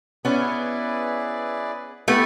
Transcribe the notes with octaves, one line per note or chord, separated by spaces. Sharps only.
B3 C#4 E4 G#4 B4 D5
A3 B3 E4 G4 B4